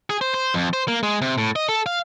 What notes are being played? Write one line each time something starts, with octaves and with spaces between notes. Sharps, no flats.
G#4
C5
C5
F2
C5
A#3
G#3
C3
A2
D#5
A4
F5